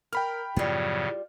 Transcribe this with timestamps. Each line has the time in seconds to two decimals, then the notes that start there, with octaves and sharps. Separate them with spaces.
0.13 A#4 G5 B5 F6
0.56 F#2 A2 C#3 F3 G3 B3 F4